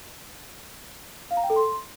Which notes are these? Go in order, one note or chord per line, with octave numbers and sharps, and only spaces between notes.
F5
A#5
G5
A4
C6